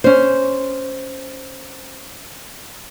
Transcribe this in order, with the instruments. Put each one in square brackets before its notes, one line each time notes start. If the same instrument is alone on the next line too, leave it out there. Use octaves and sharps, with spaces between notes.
[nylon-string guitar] C#4 C5